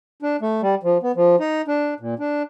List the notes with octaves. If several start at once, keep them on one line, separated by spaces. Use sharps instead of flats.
D4
A3
G3
F3
B3
F3
D#4
D4
A#2
D4